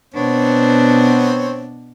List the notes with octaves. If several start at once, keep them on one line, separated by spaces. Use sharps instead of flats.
B2 B3 C4 D4 C#5